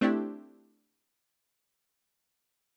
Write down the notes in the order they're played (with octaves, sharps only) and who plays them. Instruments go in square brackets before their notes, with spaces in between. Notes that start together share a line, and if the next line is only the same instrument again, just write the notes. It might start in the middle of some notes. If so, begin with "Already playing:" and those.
[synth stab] A3 C4 D4 E4 G4